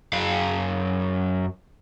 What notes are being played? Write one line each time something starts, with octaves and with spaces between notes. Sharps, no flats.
F#2 F5